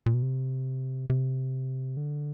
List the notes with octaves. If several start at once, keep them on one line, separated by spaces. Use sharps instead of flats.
A#2
B2
C3
C3
D3